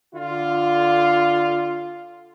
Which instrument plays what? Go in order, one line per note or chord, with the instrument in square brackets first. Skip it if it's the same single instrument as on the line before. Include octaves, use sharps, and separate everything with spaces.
[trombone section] D3 F4